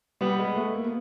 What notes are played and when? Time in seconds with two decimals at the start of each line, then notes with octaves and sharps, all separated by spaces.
0.21 G3 B3
0.39 G#3
0.56 A3
0.74 A#3
0.84 B3